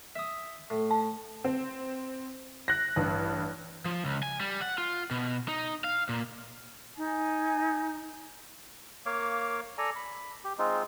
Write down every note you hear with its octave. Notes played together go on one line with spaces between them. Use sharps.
E5 D#6
A2
A5
C4
F#6 A#6
A1 G2
F3
C#2
G#5
G3
F#5
F4
B2
D#4
F5
A#2
D#4 G#5
A#3 C#5 F5 D6
A4 D5 G#5 A#5
B5
G4
G#3 C4 D#4 F4